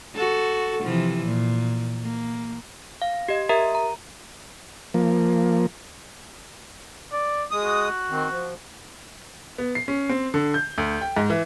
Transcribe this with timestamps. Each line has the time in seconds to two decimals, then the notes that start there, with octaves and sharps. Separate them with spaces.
0.15 F#4 A4
0.83 C3 E3 F3
1.25 A#2
2.03 A#3
3.02 F5
3.28 G4 D#5
3.49 G4 A#4 E5 A#5
3.75 A#5
4.94 F3 A#3
7.13 D5
7.51 G#3 D#6
7.64 F#4
8.10 D#3 C4
8.29 F3
9.58 B3
9.75 C7
9.88 C#4
10.09 C4
10.34 D3
10.54 G6
10.78 D2
11.01 G5
11.17 G#2
11.30 E3